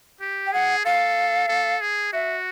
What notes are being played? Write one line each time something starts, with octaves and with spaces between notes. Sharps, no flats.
G4
G5
G#4 F#5
A4 F5
A4
G#4
F#4 E5